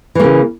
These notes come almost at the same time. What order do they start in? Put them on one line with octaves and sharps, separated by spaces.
E3 A#3 C#3